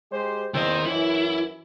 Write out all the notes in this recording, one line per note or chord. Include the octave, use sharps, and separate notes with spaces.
G#3 G4 C5
E2 D#3 A#3 C4 D#5
F#2 E3 E4